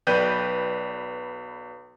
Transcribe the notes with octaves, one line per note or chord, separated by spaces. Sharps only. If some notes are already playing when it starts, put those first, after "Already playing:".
B1 B4 D5 G5 G6 D#7